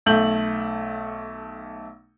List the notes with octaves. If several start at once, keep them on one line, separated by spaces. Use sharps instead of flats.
B1 A3 G6 F#7